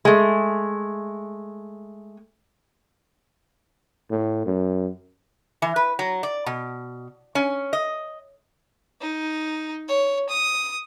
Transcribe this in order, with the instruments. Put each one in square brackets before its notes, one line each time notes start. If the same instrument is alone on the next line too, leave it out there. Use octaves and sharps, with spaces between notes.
[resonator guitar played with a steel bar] G#3 A3
[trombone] A2
F#2
[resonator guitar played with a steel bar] E3
B4
F#3
D5
B2
C#4
D#5
[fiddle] D#4
C#5
D#6